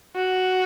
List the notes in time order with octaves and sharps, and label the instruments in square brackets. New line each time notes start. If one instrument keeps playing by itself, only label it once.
[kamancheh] F#4